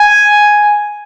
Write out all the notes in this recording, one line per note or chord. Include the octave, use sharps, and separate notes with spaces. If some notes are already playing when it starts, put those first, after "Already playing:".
Already playing: G#5